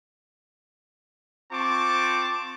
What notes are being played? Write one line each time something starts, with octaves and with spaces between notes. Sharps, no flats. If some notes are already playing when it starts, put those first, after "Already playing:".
C4 F4 A5 C#6 D6